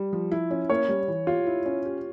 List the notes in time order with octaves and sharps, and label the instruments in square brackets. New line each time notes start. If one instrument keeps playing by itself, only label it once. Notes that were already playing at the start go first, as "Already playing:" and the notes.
Already playing: [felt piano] G3
F3
E4
C#4
[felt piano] A#3 [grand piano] C#5
[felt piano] G3
E3
[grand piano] F4 [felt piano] G4
[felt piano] E4
C#4
G4